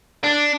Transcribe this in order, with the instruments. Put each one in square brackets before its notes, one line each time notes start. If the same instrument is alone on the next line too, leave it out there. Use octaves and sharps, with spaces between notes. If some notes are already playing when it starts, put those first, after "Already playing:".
[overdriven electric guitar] D4